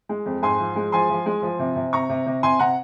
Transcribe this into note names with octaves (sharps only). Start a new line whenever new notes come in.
G#3
F2
G#2 G#5 C6
F3
G#3
F3 G#5 C6
F3
G#3
F3
C3
C3
C3 A#5 C#6
C3
C3
C3 G#5 C6
C3 F#5 A#5